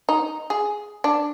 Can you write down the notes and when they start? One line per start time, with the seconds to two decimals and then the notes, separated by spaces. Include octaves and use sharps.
0.09 D#4
0.50 G#4
1.04 D4